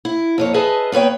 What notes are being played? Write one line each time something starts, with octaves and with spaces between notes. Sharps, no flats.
E4
F2 A#3 C#5
G#4 B4 D#5 E5 A5
A#3 B3 B4 C#5 G5